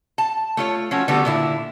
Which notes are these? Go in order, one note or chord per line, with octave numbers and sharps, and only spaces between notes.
A5
A3 F4 C#5
F3 A3 C#4 F#4
D3 G3 A3 B3 F#4 A4
A#2 D3 E4